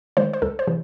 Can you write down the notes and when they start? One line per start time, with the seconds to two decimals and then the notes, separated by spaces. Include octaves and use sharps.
0.17 D#3 G#3 C5
0.33 C5
0.42 C#2 A4
0.59 C5
0.67 C3 E3